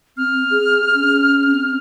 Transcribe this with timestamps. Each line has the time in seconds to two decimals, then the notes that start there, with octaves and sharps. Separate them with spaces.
0.17 C4 F6
0.51 G#4
0.95 C#4
1.52 C4